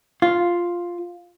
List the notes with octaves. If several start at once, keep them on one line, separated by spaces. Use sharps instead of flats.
F4